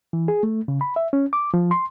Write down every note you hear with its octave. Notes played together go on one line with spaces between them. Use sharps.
E3
G#4
A3
C#3
B5
E5
C#4
D6
F3
C6